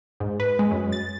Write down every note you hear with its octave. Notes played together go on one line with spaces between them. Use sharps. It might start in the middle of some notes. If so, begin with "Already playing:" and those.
G#2
B4
G#3
F#2
A6